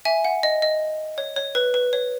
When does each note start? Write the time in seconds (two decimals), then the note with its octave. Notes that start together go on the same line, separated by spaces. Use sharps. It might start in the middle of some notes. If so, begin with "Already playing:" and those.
0.05 E5 G#5
0.24 F#5
0.43 D#5
0.62 D#5
1.18 C#5
1.36 C#5
1.55 B4
1.74 B4
1.93 C#5